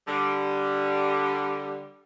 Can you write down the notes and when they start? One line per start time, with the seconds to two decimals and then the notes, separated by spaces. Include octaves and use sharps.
0.08 D3 G3